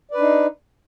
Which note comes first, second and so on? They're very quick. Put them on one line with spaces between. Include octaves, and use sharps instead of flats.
D5 B4 D4 D#4